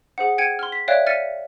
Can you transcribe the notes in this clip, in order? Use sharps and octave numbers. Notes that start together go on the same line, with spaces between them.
G#4 C5 F#5
G5 G#6 C#7 D#7
C6 F6
B6
C#5 D5 E5 F5 G5 F#6
F6 A6 B6 C#7 D#7